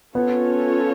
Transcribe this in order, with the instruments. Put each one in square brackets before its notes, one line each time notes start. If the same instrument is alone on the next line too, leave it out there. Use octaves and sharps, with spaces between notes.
[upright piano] B3 [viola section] C#4 F4 A4 C#5